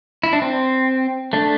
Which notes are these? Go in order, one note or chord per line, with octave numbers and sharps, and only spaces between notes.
E4
D4
C4
A3 D4